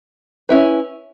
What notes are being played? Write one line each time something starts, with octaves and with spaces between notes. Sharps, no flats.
C#4 E4 B4